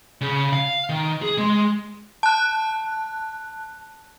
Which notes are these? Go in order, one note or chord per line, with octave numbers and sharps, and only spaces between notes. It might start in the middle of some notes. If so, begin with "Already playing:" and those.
C#3
F5
D#3
G#4
G#3
A5 F#6